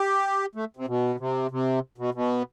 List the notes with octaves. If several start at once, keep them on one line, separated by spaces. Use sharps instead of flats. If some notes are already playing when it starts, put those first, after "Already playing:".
Already playing: G4
A3
C3
B2
C3
C3
B2
B2